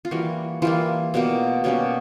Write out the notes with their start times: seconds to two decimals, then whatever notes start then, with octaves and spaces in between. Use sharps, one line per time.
0.05 F4
0.11 E3 G3 A#3 F#4
0.62 E3 G3 A#3 F4
1.14 B2 G3 A#3
1.64 B2 G3 A#3 C#4